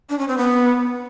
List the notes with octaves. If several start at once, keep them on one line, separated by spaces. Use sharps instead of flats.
D4
C#4
C4
B3